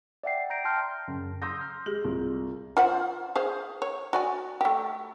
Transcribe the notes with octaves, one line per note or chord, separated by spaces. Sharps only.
D5 E5 F#5 G5 C7
A#5 G6 A#6 D7
G5 A5 C6 F6 G6
F#2 C#3
A#5 C6 D#6 E6 G6 A#6
F6
G#3 G4 G#4
C2 F4
F4 C5 F#5
G#4 C5 F5
C#5
F#4 D5 G#5
A3 G4